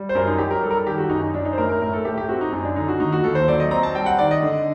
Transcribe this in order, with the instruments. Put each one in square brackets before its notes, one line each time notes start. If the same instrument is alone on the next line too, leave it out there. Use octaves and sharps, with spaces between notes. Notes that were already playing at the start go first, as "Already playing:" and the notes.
Already playing: [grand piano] G3
C5
F#2 A#4
D#4
F#3 G4
A#4
G3 A4
A#4
A4
D#3 G4
F#4
F#2 D#4
D#4
F#2 D4
D#4
C5
A2 A#4
A#4
A2 A#4
A4
A3 G4
G4
C4 F#4
D#4
F#2 D#4
D4
D3 D#4
F#4
D#2 D#4
F#4
D#2 A4
C5
F#3 D5
D#5
C4 A#5
A5
G3 G5
F#5
D#3 D5
D#5
D3